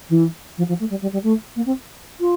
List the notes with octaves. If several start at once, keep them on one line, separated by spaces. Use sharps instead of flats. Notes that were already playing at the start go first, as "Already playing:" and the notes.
E3
F3
F3
A3
G3
G3
G3
A3
A#3
C4
F4